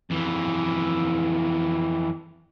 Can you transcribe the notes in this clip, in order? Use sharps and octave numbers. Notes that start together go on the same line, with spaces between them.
F2 E3